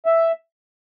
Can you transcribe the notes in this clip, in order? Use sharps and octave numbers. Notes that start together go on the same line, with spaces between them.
E5